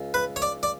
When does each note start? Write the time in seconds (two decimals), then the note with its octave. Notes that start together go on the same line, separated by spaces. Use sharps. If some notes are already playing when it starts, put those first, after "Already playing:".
Already playing: C#2
0.14 B4
0.36 C#5
0.42 D5
0.63 D5